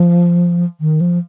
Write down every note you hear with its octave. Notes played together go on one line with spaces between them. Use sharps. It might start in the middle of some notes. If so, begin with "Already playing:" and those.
Already playing: F3
D#3
F3